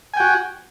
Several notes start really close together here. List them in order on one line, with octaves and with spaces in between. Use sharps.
G#5 G5 F#4